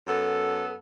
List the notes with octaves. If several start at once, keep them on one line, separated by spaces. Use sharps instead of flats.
F#2 B3 A4